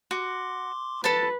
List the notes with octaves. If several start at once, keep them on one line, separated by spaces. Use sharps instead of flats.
F#4 C6 D6
A4 B4 A5